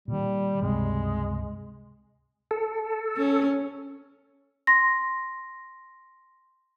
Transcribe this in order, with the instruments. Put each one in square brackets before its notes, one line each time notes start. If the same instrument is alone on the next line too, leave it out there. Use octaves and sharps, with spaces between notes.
[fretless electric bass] A#2 D#3 [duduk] G3
[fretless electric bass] C#2 G2 C3 [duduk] G#3
[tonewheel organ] A4
[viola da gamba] C#4
[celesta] C6 A#6